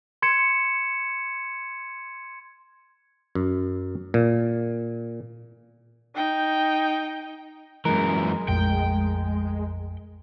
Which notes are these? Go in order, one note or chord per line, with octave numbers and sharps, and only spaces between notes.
C6 G#6 C#7 E7
F#2
A#2
D#4 G5
F#2 E3 G#3 A#4
A#1 F2 A3 G5